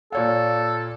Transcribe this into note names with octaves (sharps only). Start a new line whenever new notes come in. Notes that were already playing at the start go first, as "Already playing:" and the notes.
A#2 A4 C#5 F5